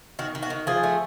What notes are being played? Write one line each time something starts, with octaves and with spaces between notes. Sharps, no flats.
D#3 F#4
D#3
F#4
D#3
F3 G#4
A3